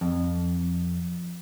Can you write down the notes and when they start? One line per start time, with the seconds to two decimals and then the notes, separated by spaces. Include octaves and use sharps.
0.01 F2